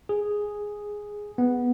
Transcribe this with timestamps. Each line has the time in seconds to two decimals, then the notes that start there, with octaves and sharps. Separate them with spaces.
0.09 G#4
1.38 B3